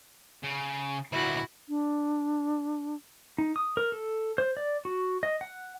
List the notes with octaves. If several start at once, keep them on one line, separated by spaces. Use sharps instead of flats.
C#3
D2 A#2 E4 F#4
D4
D#4
D#6
A#4
A4
C5
D5
F#4
D#5
F#5